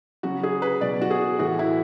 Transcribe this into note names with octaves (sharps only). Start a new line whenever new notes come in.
C#3 F#3 F#4
G#4
B4
B2 F#3 D5
F#4
G#4
A2 E3 F#4
E4